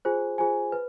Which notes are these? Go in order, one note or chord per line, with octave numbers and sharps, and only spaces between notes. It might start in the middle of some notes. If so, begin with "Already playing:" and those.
F4 G#4 C5 G#5
F4 G#4 C5 G#5
B4